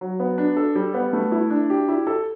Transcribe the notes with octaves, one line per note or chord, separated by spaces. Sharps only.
F#3
B3
D4
A4
G3
B3
A3
E4
D4
G4
E4
A4